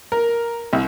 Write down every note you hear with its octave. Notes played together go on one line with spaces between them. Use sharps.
A#4
C2